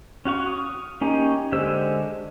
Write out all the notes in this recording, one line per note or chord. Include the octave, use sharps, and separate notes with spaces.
C#4 F#4 F5 C#6
D#6
A#3 C#4 D#4 G4
D3 G#3 G4 C5 E6